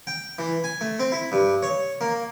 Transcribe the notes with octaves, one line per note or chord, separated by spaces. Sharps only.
G5
E3
G#5
A3
C4
E4
G2
C#5
A#3